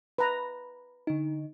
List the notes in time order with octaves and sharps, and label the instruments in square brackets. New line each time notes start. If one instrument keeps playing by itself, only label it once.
[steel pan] B4 A#5
[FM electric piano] D3 D#4